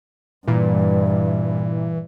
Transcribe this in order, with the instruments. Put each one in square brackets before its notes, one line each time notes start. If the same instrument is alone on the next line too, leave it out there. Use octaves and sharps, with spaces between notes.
[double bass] G2 [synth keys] A#2 [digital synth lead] E3